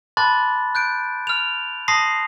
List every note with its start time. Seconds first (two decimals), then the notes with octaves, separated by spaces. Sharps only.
0.17 A5 B5 C6 D6 F#6 A6
0.75 F#6 G6 D7
1.27 F6 F7
1.88 A5 C6 D#6 A#6 C7